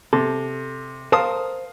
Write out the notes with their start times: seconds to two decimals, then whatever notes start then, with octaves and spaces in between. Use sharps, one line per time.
0.13 C3 A4
1.12 A#4 C5 F5 A5 D#6